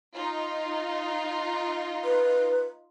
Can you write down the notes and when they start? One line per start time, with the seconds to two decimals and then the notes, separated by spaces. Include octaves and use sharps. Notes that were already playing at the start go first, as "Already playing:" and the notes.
0.14 D#4 F4
2.04 B4